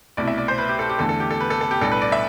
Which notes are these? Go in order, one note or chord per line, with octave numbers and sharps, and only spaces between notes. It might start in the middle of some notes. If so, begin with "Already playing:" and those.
C2 B2 A3 E4 D5
E5
D5
C5
B4
G4
A4
G4
E2 D3 A3 A4
A4
G4
A4
B4
A4
A4
G4
B1 A2 G3 D4 A4
B4
D5
E5